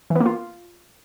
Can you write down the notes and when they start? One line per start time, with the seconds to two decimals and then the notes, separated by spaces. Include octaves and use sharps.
0.10 E3
0.15 B3
0.20 A#3
0.26 F4